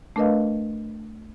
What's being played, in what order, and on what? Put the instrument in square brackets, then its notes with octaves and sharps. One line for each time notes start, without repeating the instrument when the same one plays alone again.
[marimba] A3 D4 A#4 B4 D#5 F5